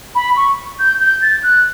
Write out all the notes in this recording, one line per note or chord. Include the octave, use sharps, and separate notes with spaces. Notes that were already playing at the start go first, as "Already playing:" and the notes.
B5
C#6
G6
G6
A6
F#6